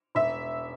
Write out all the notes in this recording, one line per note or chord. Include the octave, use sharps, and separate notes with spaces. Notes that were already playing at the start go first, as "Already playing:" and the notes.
E1 E5